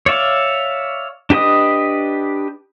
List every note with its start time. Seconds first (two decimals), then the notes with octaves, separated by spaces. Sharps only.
0.06 C#5 D5 E5 F5
1.30 D4 G4 B4 D#5 D#6